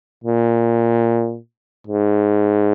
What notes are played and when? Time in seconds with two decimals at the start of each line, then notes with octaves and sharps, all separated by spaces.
0.24 A#2
1.87 G#2